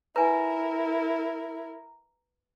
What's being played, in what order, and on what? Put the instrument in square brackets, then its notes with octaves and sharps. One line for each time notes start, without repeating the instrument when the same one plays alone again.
[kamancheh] E4 A#4 [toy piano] B4 G#5 [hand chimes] A#5